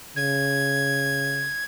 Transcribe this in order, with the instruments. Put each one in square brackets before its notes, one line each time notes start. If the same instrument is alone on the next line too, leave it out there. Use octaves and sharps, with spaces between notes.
[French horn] C#3 [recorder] G#6